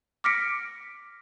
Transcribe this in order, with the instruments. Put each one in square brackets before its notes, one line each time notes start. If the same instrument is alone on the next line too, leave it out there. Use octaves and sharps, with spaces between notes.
[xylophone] D6 F6 A#6 B6 C#7 D7